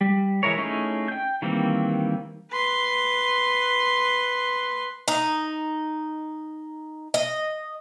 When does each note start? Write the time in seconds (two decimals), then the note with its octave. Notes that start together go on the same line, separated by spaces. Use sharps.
0.01 G3
0.43 E3 G#3 E4 A#4 C#5
0.58 A3 C#4 D#4 E4 G#4
1.08 G5 G6
1.42 D#3 E3 G3 A#3 C4
2.52 B4 C6
5.08 D#4
7.14 D#5